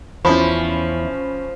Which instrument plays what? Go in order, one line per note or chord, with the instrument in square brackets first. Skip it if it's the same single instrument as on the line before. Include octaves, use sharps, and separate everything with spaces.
[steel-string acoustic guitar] E2 E4 [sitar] F3 [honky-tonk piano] C#4 B5